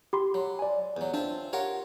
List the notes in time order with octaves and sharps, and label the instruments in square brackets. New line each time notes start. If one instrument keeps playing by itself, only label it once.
[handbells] G4 B5 C6
[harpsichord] F#3
[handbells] D5 G#5
[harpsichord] E2 F#3
[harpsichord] C4 F4 E5 [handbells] D4
[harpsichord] F4 A#4 C#5 [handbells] G4 F#5